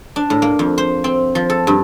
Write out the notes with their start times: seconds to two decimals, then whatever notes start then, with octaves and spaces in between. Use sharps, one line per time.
0.16 D4
0.30 A2
0.42 A#3
0.59 F2
0.78 C5
1.04 C4
1.35 F3
1.50 A4
1.67 G2